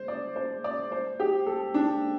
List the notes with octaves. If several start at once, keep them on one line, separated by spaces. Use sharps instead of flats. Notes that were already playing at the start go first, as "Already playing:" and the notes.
Already playing: C5
D5
C5
D5
C5
G4
A4
D4